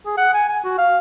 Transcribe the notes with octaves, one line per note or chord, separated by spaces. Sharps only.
G#4
F#5
G#5
G#5
F#4
F5